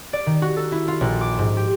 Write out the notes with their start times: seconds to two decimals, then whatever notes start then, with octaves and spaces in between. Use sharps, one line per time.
0.13 D5
0.26 D#3
0.42 F#4
0.56 A4
0.72 E4
0.88 F4
1.01 A#1
1.21 D6
1.39 G#2
1.57 G4